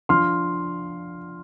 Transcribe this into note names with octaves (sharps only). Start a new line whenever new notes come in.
F3 D4 F4 C6 F6